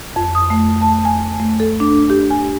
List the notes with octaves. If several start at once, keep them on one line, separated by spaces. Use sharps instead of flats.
F2
D#6
A3
A5
G#5
A3
A4
D4
G4
G#5